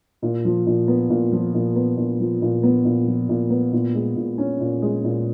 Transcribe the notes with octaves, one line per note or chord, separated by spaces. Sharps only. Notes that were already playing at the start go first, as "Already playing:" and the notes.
A#2
F3
A#2
B3
A#2
F3
A#2
B3
A#2
F3
A#2
B3
A#2
F3
A#2
B3
A#2
G#3
A#2
C#4
A#2
G#3
A#2